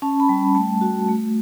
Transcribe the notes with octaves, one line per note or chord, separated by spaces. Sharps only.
C#4 A5
B5
G3
A3 A5
F#4
A3